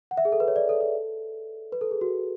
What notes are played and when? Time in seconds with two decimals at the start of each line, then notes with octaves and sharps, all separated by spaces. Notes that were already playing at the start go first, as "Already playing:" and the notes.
0.11 F#5
0.17 E5
0.25 G#4
0.32 A4
0.40 B4
0.48 C#5
0.56 D5
0.69 A4
0.81 A4
1.72 B4
1.81 A4
1.91 G#4
2.01 F#4